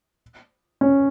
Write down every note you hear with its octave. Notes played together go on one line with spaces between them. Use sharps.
C#4